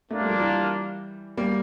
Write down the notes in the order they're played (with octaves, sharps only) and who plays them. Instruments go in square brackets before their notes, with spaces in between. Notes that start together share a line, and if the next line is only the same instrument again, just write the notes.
[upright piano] A3 [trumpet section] A#3 D4 F4 A#4 D5
[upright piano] G3
F3
E3 G3
G3 A#3